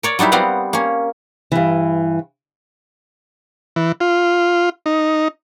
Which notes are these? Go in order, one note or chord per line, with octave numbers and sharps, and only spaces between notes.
A#4 C#5 D5
F#3 G3 D#4 E4 E5
G3 B3 C4 D#5 F5 F#5
A#3 C#4
G2 E3
E3
F4
D#4